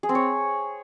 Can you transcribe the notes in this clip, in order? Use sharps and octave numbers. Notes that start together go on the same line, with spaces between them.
G#4
C4
C#5